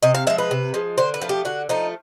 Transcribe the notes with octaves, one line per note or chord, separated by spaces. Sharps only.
C3 D#5
F5
F3 G#3 E5
B4
C3
F3 G#3
D3 C5
B4
F3 A3
G4
D3 F#4
F3 A3 D#4